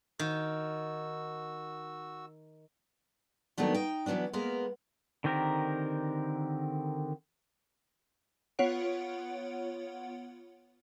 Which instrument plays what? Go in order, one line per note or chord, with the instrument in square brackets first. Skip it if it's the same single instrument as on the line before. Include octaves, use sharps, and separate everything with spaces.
[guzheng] D#3 [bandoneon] F#4 E6
[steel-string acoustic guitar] D#3 F#3 A3 B3 D4
D#4 G5
E3 F#3 G#3 B3 D4
G#3 A#3 B3 A#4
[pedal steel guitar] D3 D#3 C4 G4 A#4
[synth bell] B3 F4 C#5 F#5 D7